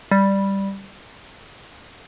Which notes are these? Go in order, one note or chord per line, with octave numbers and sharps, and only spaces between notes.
G3